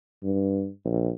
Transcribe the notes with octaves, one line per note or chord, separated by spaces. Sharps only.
G2
A#1